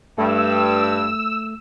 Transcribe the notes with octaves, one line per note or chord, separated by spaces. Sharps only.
G2 A3 E6